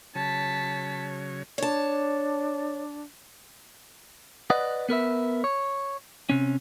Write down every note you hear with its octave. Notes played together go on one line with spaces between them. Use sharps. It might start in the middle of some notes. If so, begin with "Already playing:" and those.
C#3 F#3 C#5 A5 B6
D4 C#5 A5
B4 D5 D#5 F#5
B3 A#4 B4 E5
C#5
C3 C#4